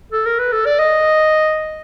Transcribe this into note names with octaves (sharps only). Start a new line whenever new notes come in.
A4
A#4
B4
A4
D5
D#5